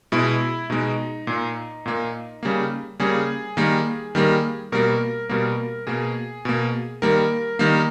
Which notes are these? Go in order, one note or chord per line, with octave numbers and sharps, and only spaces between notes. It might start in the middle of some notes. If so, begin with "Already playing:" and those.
B2 G#3 E4
B2 G#3 D#4
A#2 A#3
A#2 A#3
C#3 G3 A#3
C#3 G3 A#3 G#4
D#3 G3 A#3
D#3 G3 A#3
B2 G3 A#3 A#4
B2 G3 A#3 A#4
B2 A#3 G#4
B2 A#3
D#3 G3 A#3 A#4
D#3 G3 A#3